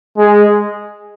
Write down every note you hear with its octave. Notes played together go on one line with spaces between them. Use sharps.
G#3